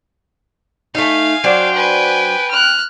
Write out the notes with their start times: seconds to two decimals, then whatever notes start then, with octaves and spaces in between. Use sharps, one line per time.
0.95 A3 D#4 F5 G#5
1.44 F#3 D4 C5 G5
1.74 B4 G#5
2.51 F6 F#6